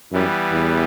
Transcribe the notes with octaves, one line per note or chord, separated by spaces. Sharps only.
F#2 E3 G3 B3
E2